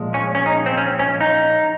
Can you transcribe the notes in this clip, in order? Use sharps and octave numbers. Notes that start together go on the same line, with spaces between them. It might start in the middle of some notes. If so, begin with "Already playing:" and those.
Already playing: A#2 F3 G#3
C#4
C#4
D#4
C4
C#4
C#4
D#4